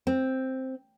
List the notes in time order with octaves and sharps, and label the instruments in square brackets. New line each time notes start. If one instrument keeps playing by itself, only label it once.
[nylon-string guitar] C4